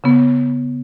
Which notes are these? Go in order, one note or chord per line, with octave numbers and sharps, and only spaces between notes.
C#3 B3